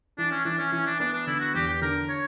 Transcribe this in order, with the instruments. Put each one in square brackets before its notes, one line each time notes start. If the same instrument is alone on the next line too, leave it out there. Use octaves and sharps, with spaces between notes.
[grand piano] E3 [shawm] D4
[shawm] C#4
[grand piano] E3 [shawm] D4
[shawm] C#4
[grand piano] E3 [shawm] C#4
[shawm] D4
[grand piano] B3 [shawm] D4
[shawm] D4
[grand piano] D3 [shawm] E4
[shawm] F#4
[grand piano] E2 [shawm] G4
[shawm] G4
[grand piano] D3 [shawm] A#4
[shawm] C#5